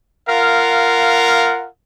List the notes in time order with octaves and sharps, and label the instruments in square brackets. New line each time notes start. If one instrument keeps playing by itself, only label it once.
[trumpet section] F4 A#4 F5 F#5